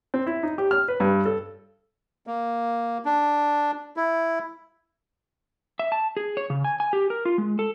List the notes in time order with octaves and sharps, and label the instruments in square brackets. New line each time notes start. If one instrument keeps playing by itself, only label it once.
[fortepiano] C4
E4
D#4
G4
F6
B4
G2
A4
[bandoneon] A#3
D4
E4
[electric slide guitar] E5
A5
G#4
C#5
C#3
G#5
G#5
G4
A#4
F4
G#3
A4